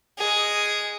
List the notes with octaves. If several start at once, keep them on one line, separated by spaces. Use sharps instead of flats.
G#3 G#4